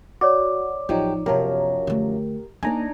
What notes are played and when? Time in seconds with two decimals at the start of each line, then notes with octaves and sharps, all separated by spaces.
0.21 F#4 C#5 D5 D6
0.89 A1 F3 F#3 D#4 F4 G4
1.26 F#2 C3 F3 F#3 B3 G4 A#4
1.87 D3 A3
2.63 A#3 D4 D#4 D5 G#5 A#5